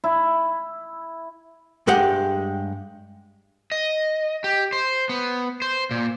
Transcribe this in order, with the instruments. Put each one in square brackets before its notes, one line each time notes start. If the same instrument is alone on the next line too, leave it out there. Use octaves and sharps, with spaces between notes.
[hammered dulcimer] E4
[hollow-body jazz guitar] G2 G#3 G4 F#5
[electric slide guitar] D#5
G4
C5
B3
C5
A#2